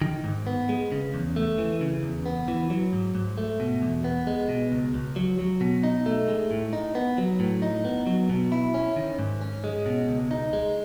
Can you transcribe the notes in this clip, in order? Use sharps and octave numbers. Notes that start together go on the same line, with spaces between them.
D#3
G#2
B3
G#3
C#3
E2
A3
E3
C#3
E2
B3
E3
F#3
G#2
G#2
A3
B2
E2
B3
G#3
B2
C#2
C#2
F#3
F#3
B2
D#4
A3
G#3
A2
D#4
B3
F#3
A2
D#4
B3
F#3
B2
E4
C#4
D#3
G#2
C#4
G#3
B2
C#2
D#4
G#3